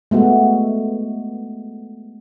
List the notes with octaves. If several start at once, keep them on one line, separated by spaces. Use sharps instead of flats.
G#3 A3 B3 F#4